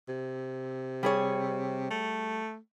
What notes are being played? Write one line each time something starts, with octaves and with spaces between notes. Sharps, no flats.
C3
G3 G#4 C#5
A3